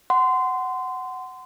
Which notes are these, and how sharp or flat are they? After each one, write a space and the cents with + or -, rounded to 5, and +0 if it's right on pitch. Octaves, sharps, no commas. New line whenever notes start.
F#5 +10 C6 -20